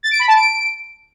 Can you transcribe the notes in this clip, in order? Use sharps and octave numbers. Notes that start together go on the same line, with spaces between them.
A6
D7
B5
A5
D7